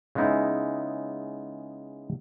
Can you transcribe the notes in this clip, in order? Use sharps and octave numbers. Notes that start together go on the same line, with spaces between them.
C#3 G#3 B3 D#4 E4